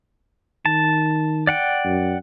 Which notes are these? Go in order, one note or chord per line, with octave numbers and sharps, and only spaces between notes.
D#3 A5
D5 F#5 G5
F#2